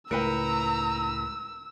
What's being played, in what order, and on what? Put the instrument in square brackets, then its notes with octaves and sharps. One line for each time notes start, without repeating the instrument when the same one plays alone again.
[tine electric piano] C#2 A2 C#7 [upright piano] A#4 B4 G5 [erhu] A#5 [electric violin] E6